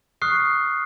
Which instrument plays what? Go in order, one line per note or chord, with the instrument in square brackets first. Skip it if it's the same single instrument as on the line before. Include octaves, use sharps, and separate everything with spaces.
[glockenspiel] C#6 D#6 F6 F#6 C7